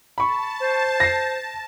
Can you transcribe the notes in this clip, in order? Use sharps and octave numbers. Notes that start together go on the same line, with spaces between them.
A5 B5 C#6
C5
A#6 C7